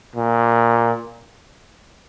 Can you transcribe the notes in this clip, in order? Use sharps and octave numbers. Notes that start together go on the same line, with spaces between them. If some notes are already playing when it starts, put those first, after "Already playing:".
A#2